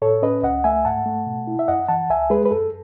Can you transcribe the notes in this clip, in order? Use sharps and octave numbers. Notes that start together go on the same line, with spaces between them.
A2 A4 C#5
C#4 B4 D#5
C#2 D#5 F#5
A3 E5 G#5
G#2 F#5 A5
A3
B2
E4
E5
F#2 D#5 F#5
E3 F#5 A5
C#2 E5 G#5
G#3 G#4 B4
B4
F#2 A4